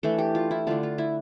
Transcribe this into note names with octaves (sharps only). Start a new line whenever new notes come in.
E3 A3 D4 A4
G4
F4
E4
D3 A3 D4 F4
F4
E4